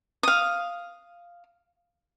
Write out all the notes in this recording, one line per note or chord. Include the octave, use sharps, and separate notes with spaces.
F5 D#6